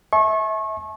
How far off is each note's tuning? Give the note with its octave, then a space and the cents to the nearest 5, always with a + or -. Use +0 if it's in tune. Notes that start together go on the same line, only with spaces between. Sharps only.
E5 -25 A5 -40 C#6 -30